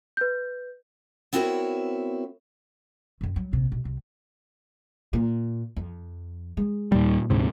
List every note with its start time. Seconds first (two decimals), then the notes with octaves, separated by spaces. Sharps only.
0.17 B4 G6
1.33 B3 C4 E4 F#4 A#4 C#5
3.21 F#2 D#3
3.36 F#3 G3
3.53 A#1 C3
3.72 B1
3.85 C2
5.13 A#2
5.76 F2
6.57 G#3
6.92 D#2 A#2 G3
7.30 D2 G#2 C3